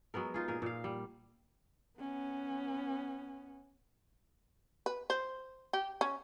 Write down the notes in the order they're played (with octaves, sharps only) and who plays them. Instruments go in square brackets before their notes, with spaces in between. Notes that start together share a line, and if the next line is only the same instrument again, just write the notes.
[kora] F#3 G#3 B3 A#4
D#4 F4 G#4
A#2 G#4 A#4
A#2 F5
G3
[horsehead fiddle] B3 C#4
[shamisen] B4
C5
G4
C#4